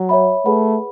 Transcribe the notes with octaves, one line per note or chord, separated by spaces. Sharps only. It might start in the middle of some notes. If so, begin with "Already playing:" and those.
Already playing: F#3
C#5 E5 B5
A3 G#4 B4 F#5 B5